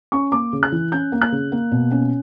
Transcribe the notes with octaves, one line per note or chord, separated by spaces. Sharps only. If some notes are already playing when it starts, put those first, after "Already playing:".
C#4 C#6
A#3 D6
C#3
F#6
E3
C#4 G6
A#3
F#6
C#3
A#3
B2
C#4